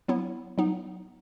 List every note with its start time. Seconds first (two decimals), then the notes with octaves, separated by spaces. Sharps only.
0.08 F#3 B3 E4
0.58 F#3 B3 D#4